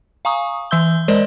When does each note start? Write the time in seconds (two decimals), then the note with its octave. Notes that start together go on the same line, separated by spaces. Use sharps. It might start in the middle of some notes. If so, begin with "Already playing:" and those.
0.25 F5 G#5 A#5 C#6 D#6
0.71 E3 E5 C6 E6 G6 G7
1.08 G#3 A#4 C5 D5 D#5